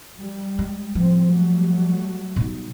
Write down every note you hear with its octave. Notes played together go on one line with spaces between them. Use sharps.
G3
G#3
A2 F3 G3 C4
F#3 G3 A3
B2 D#4